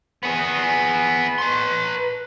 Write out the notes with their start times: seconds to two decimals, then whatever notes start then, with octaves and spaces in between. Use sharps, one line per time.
0.23 B3 G#4
1.38 B4 C6